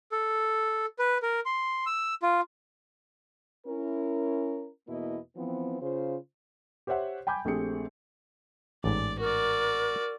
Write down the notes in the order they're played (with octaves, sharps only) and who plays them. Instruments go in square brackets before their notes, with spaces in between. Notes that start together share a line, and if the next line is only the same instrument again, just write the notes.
[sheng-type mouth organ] A4
B4
A#4
C6
E6
F4
[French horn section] C#4 E4 A#4
E2 B2 A#3 B3 E4 D#5
E3 F3 B3 C4
C#3 F4 C5
[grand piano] G4 C5 C#5 E5 F#5
G5 G#5 B5 D6 G6
A#1 A3 C4 G4 G#4 C#7
[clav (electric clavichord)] A1 G#2 [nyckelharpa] D5
[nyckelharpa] F#4 D5 [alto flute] A#4